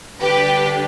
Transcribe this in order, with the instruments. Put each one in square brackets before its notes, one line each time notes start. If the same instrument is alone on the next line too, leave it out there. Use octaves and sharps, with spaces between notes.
[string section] D3 G3 D4 G4 B4